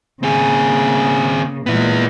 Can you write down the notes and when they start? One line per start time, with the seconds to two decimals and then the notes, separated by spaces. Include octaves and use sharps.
0.23 C#3 A#3 C4 G#4
1.66 A#2 G#3 B3 E4